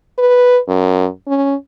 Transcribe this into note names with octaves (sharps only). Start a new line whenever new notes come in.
B4
F#2
C#4